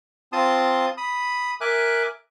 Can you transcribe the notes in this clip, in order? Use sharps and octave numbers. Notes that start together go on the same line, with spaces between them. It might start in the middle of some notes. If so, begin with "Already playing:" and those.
C4 F4 A5 C6 D#6
B5 D#6
A#4 E5 G#5 D6 F#6